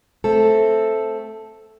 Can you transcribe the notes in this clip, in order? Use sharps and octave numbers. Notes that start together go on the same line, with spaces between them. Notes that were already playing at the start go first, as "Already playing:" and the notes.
A3 C4 A4